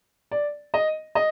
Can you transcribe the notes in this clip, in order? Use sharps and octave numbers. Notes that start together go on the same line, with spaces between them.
D5
D#5
D#5